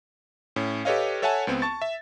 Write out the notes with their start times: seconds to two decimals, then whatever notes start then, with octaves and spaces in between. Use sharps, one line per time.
0.56 A2 C#4
0.85 G4 A4 B4 C#5 D#5 F5
1.22 A4 C#5 E5 F#5 G#5 A5
1.47 C#2 B3 C4
1.62 A5 C#6 A6
1.82 E5